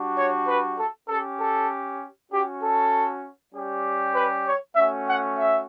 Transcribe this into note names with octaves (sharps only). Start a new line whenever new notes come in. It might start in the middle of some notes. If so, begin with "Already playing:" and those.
Already playing: G3 D4 F#4
C#5
B4
A4
C#4 G4 A4
A4
C#4 F#4 G4
A4
G3 C#4 G4
B4
C#5
A3 C#4 F#4 E5
F#5
E5